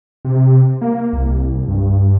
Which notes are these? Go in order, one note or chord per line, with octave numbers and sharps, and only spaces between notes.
C3
A#3
C2
G2